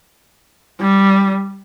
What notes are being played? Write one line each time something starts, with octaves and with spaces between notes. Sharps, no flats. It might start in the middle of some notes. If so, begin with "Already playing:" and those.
G3